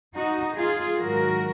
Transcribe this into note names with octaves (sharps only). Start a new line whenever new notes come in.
D#4 F#4
F4 G#4
G#2 D#3 F#3 F#4 A#4